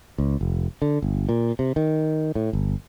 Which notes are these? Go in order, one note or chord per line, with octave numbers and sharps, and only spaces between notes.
C#2
F1
D3
G1
A#2
C3
D#3
A2
G1